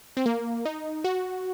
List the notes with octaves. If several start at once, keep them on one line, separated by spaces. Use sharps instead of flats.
C4
A#3
D#4
F#4